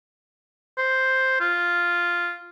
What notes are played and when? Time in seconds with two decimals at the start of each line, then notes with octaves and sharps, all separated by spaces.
0.78 C5
1.40 F4